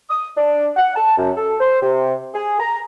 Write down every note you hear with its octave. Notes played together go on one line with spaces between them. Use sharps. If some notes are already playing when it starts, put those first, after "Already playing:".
D#6
D4
F#5
A5
F#2
A4
C5
C3
G#4
A#5